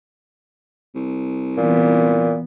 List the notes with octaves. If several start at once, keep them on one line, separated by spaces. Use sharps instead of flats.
C2
A#2 E3 B3